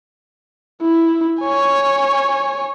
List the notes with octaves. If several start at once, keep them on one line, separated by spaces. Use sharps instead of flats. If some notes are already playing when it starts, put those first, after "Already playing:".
E4
C#5 G#5